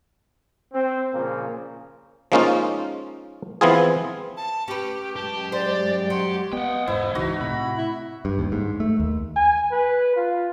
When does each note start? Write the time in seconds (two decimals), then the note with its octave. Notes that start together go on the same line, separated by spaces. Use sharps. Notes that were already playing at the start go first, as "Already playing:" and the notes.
0.72 C4
1.14 A#2 C#3 F3 A#3
2.32 F3 G#3 A#3 C#4 D#4 F4
3.61 E3 F3 B3 C4 F4 G#4
4.37 A5
4.68 C#4 G4 B4
5.16 F#2 G#3 G4 A5
5.52 C5 D5
6.10 F#3 C6
6.53 B3 D#5 F#5 G5
6.88 E1 E2 G#2 E4 C5
7.15 C#2 E3 D#4 F#4
7.41 A2 C3 B5
7.78 E4
8.25 G2
8.39 D#2
8.52 G#2
8.80 A3
9.00 D#2
9.36 G#5
9.72 B4
10.16 F4